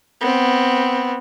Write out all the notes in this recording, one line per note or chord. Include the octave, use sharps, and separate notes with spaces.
B3 C4